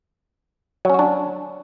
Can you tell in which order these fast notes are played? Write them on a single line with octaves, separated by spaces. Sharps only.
F#3 C#4 F#4 D4